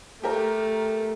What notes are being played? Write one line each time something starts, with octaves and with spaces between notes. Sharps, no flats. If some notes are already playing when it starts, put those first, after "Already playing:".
A3 G4 A#4